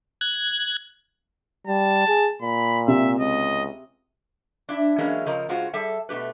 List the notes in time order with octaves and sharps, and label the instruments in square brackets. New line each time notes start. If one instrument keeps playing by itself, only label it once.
[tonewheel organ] F#6 G#6
[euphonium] G3 [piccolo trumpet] A5
[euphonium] G#4
[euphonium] A#2 [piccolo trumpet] B5
[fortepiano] C3 [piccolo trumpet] E5
[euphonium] C#2 [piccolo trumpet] D#5
[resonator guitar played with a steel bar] D4 E4
E3 F#3 G#3 A#3 C#4 E4
C#3 F3 A#4 D#5
C#3 G#3 F4 F#4 C5
G3 G#4 A4 E5 A5
B2 A3 G4 B4